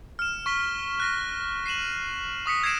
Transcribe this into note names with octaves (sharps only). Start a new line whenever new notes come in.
F6 E7
C#6 B6 G7
F#6 A#6 B6
C7 D#7 E7 F#7
C#6 D#6 B6 C#7
E6 G#6 A#6 C7 D7 E7